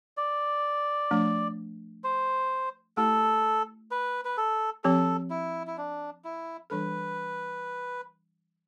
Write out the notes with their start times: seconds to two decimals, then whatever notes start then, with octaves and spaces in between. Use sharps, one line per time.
0.17 D5
1.11 F3 A3 D4
2.04 C5
2.97 A3 E4 G4 A4
3.91 B4
4.25 B4
4.37 A4
4.84 F3 C4 G4 A4
5.30 E4
5.67 E4
5.78 D4
6.24 E4
6.70 E3 G3 D4 A4 B4